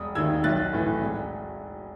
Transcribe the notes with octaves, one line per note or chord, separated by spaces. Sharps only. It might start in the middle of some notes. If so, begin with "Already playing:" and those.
Already playing: E1 D#6
D#2 D#3 E6 G#6
B1 F#6 A6
A2 E3
E1